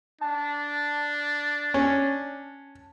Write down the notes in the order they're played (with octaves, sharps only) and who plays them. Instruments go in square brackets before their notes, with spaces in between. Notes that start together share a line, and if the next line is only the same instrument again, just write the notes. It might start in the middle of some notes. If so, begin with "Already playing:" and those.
[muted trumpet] D4 [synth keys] A5
[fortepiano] C#4